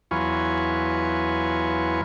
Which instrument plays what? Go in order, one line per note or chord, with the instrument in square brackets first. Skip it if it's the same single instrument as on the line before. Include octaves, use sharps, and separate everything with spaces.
[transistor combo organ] E2 F#3 F4 B4 G#5 C#6